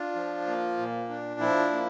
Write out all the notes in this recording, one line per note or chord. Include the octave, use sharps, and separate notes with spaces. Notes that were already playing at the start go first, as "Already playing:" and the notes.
Already playing: D4 F4
F3
A#3
A#2
D4
F3 E4
A#3